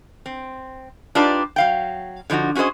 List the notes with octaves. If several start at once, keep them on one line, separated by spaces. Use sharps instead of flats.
C4
D4 D#4 F4 G4 B4 D5
F#3 F5 G5
D3 F3 D#4 E4 F#4
C#4 F#4 G#4 C5 D#5